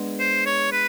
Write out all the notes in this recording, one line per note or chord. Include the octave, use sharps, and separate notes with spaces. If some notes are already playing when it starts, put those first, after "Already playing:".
Already playing: G#3 B3 D4
C5
C#5
B4